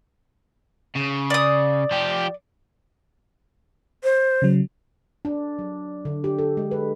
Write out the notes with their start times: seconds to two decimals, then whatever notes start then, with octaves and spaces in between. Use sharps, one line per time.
0.96 C#3
1.30 D5 D#6
1.91 F3 G4
4.04 C5
4.42 C#3 F#3
5.25 D4
5.59 F#3
6.05 D3
6.24 G4
6.39 A4
6.57 G#3
6.71 B4